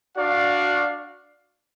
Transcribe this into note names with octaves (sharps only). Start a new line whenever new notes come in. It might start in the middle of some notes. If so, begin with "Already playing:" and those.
D4 F#4 D5 F5